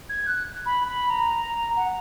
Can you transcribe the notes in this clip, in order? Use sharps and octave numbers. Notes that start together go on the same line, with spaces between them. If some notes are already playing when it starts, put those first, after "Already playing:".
G#6
F#6
B5
B5
A#5
F#5